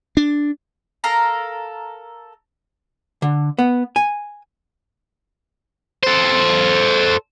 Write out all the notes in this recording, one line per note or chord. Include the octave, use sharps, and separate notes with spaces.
D4
A4 A#4 F5 A#5
D3
B3
G#5
A4 C5